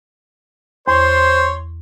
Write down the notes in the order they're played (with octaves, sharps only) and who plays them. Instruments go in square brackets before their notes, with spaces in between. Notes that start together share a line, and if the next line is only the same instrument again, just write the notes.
[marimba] E2 [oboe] C5 [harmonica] C#5 C6